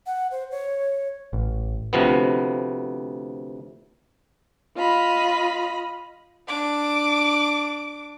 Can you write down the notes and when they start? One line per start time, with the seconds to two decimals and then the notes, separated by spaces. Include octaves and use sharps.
0.07 F#5
0.31 C5
0.51 C#5
1.33 A1
1.93 D2 C3 F3 B3
4.76 F4 D#5 B5
6.48 D4 D6